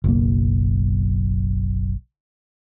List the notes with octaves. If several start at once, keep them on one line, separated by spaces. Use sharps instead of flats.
F#1 B1 A#3